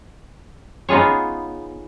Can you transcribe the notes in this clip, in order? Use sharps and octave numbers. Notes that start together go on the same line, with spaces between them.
B3 D#4 F4 G#4 C#5